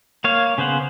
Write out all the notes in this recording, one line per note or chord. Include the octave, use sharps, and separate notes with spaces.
A#3 C#5 F5
C#3 B3 C5 F#5